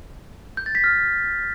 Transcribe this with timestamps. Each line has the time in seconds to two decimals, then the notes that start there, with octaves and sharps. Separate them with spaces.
0.57 G6
0.66 A6
0.75 B6
0.84 F6